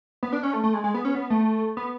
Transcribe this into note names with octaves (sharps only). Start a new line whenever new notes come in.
B3
D4
C#4
A3
A3
G#3
G#3
B3
C#4
B3
A3
B3